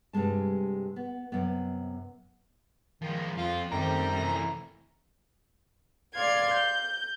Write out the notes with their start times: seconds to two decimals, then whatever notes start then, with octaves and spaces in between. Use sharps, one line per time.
0.13 G2 C3 G3 G#3 A5
0.96 B3
1.32 F#2 C3 B3
3.02 D#3 F3 G#3
3.37 F2 F3 C4 F4
3.72 F#2 D#3 G3 A3 C4 G5 A#5
4.19 C3 E3
6.15 D5 F5 C6 G#6
6.53 G6